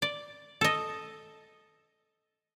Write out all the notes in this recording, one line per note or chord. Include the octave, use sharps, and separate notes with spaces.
D5
A4 D#5